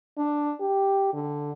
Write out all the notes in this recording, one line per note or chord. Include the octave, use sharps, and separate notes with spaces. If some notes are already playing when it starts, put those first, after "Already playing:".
D4
G4
D3